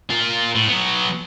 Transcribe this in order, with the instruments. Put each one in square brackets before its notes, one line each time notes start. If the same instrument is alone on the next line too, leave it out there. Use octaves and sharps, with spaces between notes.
[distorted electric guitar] F4 A#4
A2
F#3 B3